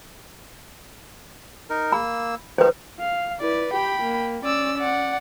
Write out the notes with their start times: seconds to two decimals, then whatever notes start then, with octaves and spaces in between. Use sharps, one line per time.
1.70 D#4 A#4
1.92 A#3 B5 E6
2.58 D#3 F3 D#4 B4 C5
2.99 F5
3.41 E4 B4 D5
3.73 G4 G5 B5
4.02 A#3
4.44 C#4 D5 E6
4.78 D5 F#5